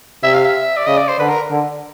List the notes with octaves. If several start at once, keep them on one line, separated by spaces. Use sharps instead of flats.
C3 E5
F5
E5
D5
C#3 D#5
D5
C5
D3 B4
A#4
D3